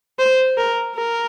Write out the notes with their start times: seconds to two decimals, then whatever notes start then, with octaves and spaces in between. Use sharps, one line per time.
0.19 C5
0.57 A#4
0.96 A#4